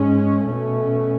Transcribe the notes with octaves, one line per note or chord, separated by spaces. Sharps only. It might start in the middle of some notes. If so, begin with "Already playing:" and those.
Already playing: G#2 G#3 C#4
B2 A3 C#4